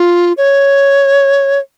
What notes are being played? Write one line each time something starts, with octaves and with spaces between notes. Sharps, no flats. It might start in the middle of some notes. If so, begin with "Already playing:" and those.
Already playing: F4
C#5